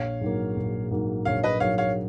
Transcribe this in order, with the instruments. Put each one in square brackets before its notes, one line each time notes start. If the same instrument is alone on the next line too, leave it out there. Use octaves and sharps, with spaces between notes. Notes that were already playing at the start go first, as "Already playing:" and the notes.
Already playing: [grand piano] A#1 [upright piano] C#5 F5
[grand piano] G#2 F#3 A#3
A#1
G#2 F#3 A#3
[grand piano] A#1 [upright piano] C#5 F5
[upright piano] B4 D#5
[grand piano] G#2 F#3 A#3 [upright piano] C#5 F5
[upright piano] C#5 F5